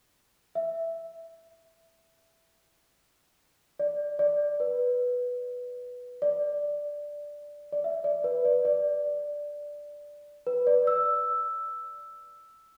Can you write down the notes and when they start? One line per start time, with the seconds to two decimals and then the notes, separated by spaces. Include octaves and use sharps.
0.55 E5
3.79 D5
4.19 D5
4.60 B4
6.22 D5
7.72 D5
7.84 E5
8.04 D5
8.24 B4
8.45 D5
8.65 D5
10.47 B4
10.67 D5
10.87 E6